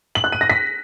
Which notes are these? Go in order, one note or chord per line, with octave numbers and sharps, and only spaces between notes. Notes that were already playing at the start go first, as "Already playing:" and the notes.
F#7
F#6
D#7
A#6
B6